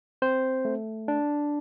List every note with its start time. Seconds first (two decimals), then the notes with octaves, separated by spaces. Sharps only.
0.22 C4 C5
0.65 A3
1.08 D4